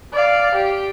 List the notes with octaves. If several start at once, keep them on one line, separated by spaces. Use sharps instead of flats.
D5 F5
G4